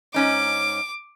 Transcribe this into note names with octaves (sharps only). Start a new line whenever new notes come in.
G#2 C#4 D#4 D6